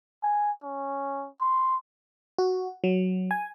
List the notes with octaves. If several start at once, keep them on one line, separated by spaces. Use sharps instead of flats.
G#5
C#4
C6
F#4
F#3
G#5